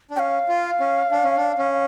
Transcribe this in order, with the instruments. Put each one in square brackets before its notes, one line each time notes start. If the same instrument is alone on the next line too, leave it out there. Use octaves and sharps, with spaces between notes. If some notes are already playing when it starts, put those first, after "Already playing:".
[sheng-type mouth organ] D4
[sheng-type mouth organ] C#4 [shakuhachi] F5 G5
[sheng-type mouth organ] F4
C#4
D4
C#4
D4
C#4